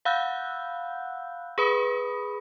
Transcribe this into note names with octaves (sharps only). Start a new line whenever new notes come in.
F5 F#5 B5 E6 F#6 G6
G#4 B4 B5 D#6